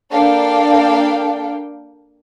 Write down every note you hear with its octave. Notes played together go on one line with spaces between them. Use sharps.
A#3 D4 A4 F5 G5